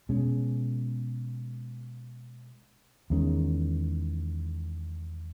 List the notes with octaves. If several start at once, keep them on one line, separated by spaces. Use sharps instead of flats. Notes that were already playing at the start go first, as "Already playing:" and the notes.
B2 G#3 C#4
E2 D#3 G#3 C#4